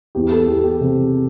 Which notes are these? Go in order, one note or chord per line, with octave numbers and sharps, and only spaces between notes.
E2 G4
A4
E2 G4
G4
C3